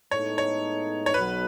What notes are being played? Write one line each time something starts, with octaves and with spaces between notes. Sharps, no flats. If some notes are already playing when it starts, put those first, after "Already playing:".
A2 G#3 B3 D#4 A4 C#5
C#5
C#5
B1 B2 F#3 B4